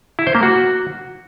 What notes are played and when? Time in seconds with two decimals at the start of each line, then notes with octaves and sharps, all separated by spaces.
0.19 E4
0.27 C5
0.35 A#3
0.43 F#4